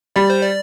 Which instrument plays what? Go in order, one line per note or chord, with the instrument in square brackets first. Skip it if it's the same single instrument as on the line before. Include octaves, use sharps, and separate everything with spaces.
[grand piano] G3 [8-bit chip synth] D5
[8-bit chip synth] C5
D5